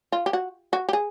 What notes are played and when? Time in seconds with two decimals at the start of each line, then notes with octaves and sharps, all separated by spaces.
0.12 F4
0.26 G4
0.33 F#4
0.73 F#4
0.89 G4
0.93 G#4